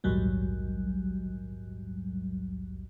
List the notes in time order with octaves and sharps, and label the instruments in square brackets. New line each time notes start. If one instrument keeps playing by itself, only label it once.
[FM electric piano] A#1 D#2 G#2 F#3 G3